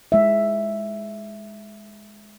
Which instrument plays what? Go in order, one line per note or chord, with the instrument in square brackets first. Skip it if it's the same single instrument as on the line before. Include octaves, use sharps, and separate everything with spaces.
[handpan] G#3 E5